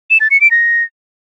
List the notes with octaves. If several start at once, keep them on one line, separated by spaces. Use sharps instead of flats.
E7
A6
C#7
D7
A#6